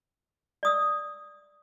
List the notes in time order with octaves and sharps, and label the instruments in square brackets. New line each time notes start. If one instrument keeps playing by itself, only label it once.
[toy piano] D5 D#6 E6